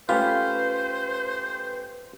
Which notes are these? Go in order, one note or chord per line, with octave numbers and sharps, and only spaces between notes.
A3 C#4 F4 G4 B4 C5